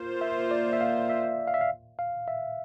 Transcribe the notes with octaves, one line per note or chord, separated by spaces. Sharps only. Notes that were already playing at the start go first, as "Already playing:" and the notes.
Already playing: A#3 F4 C5
E5
D5
E5
F5
E5
F5
E5
F5
F5
E5